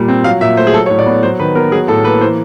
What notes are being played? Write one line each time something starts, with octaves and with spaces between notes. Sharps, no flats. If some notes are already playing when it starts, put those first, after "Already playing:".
Already playing: A#2 G3
C4
F#3 F5
A#2 E5
A3 C5
G#4
F#3 A4
C#5
A2
D5
B3
F#3 C5
D#3 B4
B3 A#4
F#3 G#4
A2 A4
A#3 B4
E3 C5